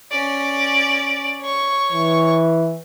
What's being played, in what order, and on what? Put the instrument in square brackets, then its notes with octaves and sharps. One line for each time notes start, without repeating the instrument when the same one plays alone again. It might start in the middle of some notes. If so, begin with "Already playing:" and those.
[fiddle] C#4 D5
C#5 C#6
[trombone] E3